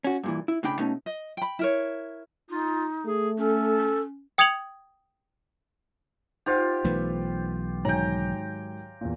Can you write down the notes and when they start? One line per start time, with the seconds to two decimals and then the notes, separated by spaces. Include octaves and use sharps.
0.04 C#4 F#4
0.23 G2 A#2 E3
0.48 E4
0.63 A2 C#3 D4 G5 A#5 B5
0.79 B2 A3 C#4 D#4
1.06 D#5
1.37 G5 B5
1.59 E4 A#4 C#5
2.50 D#4 F4
3.06 A3 G#4
3.38 C#4 A4
4.38 G5 D#6 G#6 C#7 F7 F#7
6.46 D#4 F4 G4 C5 F#5
6.84 B1 E3 A3 B4
7.85 G#2 D#3 F#3 C#5 G5 G#5 A#5
9.01 E2 A#2